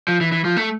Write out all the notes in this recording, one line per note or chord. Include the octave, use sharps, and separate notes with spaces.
F3
E3
E3
F3
A3